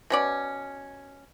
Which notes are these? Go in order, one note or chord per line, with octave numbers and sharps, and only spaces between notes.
B2 C#4 D5